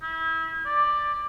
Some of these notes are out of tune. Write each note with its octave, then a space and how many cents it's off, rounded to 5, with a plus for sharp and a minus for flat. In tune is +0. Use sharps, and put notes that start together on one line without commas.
E4 -30
D5 +10